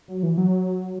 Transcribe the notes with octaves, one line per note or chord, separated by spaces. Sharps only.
F#3
E3
F#3